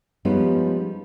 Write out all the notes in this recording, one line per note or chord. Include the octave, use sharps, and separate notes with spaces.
F3 G3 G#3 B3 C#4 D#4